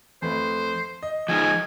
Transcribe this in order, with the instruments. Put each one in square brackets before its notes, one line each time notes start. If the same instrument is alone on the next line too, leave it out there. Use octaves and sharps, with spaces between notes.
[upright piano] F2 A3 B4 [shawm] C5
[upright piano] D#5
[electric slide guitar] F3 G#3 D#4 [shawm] G#5